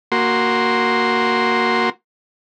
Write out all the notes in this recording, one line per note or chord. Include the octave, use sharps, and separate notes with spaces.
A#3 F#4 C6